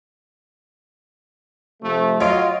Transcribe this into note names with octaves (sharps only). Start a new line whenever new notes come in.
C3 F3 A3
F#3 F4 C#5 D#5 D7